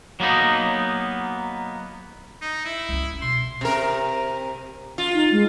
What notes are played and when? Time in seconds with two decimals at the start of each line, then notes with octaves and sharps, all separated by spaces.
0.20 F#3 A#3 B3 D#4
2.42 D#4
2.65 E4
2.89 C#2 C#4
3.22 B2 C6
3.61 C3 A#4
4.98 F4
5.14 D#4
5.31 G#3